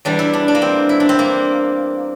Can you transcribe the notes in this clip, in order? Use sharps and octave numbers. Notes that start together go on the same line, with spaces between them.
E2 E3 G3 D4
E4
D4
D4
A#3
C4
E4
D4
C4
A#3